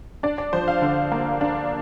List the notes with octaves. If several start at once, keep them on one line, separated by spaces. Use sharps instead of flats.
D4 D5
D5
F3 C5
F5
D3
A#3
D4